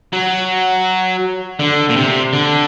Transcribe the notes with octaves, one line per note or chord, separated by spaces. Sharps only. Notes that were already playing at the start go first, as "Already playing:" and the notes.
F#3
D3
A#2
C3
D3